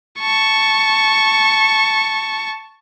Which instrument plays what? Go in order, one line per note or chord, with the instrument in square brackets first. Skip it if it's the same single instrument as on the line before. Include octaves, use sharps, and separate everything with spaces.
[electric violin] A5 C#6